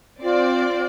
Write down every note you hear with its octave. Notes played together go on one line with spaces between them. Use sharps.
C4 F4 D5